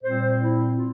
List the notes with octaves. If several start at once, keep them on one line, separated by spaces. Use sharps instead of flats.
A#2 G3 C4 C5
E4
F4